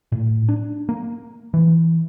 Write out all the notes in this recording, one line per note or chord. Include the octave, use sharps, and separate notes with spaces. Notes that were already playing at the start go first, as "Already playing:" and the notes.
A2
D4
A#3
E3